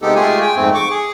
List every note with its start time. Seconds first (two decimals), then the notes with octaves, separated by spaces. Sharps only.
0.02 C3 G#3 B3 D#4 G4 A4
0.15 G#3 A3 F4 G4 G#4 G#5
0.42 G5 G#5
0.56 F2 G#2 A3 C4
0.75 C#6 D6
0.90 G#4